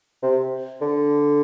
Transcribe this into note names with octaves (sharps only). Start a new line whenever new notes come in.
C3
D3